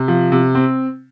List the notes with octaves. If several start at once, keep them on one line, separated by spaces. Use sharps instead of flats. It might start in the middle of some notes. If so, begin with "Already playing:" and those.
Already playing: C3
F3
C3
C4